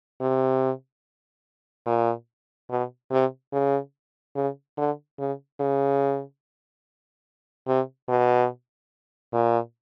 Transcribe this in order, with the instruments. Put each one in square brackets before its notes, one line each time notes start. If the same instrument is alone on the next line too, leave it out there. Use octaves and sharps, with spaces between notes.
[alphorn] C3
A#2
B2
C3
C#3
C#3
D3
C#3
C#3
C3
B2
A#2